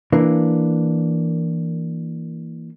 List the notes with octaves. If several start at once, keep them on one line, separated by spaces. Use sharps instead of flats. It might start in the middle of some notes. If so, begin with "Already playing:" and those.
E3 A#3 D4